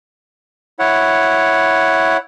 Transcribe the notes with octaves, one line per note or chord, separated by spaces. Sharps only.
E4 C#5 F#5